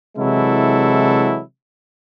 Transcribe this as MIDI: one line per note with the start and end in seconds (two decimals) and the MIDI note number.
0.18 1.41 48
0.18 1.41 52
0.18 1.41 54
0.18 1.41 56
0.18 1.41 64
0.18 1.41 69